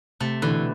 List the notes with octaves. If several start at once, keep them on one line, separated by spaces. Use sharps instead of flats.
C3 A3
B2 D3 E3